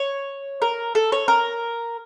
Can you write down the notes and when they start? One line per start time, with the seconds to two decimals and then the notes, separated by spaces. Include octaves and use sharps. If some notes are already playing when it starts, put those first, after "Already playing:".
Already playing: C#5
0.62 A#4
0.95 A4
1.12 C#5
1.28 A#4